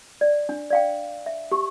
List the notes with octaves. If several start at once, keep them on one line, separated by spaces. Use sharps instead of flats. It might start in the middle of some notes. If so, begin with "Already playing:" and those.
D5
D4
D5 F5 G5
E5
G4 C#6